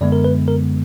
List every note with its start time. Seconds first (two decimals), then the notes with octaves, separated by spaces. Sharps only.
0.01 F#2 D3 G#3 B3 D5
0.12 A#4
0.24 B4
0.48 A#4